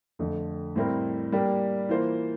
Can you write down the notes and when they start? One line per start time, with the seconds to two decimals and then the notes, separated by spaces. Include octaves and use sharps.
0.19 F2 D3 A3
0.76 A2 G3 C4 E4 A#4
1.32 G3 A#3 D4 G4
1.89 E3 A#3 F4 C5